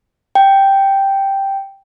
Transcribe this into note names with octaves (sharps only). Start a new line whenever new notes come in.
G5